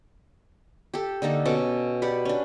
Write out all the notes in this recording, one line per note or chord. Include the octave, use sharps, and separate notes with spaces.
G4 A4
D3 A#3 D#4 A4
B2 C#4 A4 D6
G4 B4 D5 F#5
C#4 D4